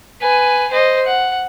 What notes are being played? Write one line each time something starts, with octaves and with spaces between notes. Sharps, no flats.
B4 G#5
C5 D#5
F#5